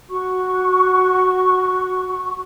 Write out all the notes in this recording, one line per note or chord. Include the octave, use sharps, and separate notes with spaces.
F#4 C#6